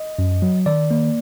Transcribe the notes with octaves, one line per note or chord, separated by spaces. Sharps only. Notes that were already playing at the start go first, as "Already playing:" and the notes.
Already playing: D#5
F#2
F#3
D#3 D5
A#3